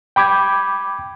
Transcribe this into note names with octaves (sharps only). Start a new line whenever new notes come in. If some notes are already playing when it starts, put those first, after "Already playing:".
G5 B5 D6 G6 G#6